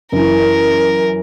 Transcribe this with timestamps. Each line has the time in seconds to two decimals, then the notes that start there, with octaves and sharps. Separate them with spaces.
0.12 F#2 E3 A#4